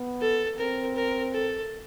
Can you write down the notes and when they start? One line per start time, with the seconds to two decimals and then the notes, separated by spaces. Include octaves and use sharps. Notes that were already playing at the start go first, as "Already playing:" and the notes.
Already playing: B3
0.21 A4
0.58 C4 A#4
0.96 A#4
1.34 A4